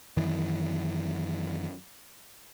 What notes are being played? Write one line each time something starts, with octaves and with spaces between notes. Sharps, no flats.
F#2 D#3 E3